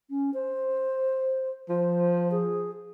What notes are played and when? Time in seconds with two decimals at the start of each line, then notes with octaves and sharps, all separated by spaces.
0.10 C#4
0.34 C5
1.69 F3 C5
2.31 G#4